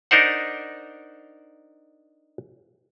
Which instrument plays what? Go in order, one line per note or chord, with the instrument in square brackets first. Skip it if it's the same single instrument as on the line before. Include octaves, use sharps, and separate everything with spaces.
[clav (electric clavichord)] D4 D#4 A#4 C5 F#5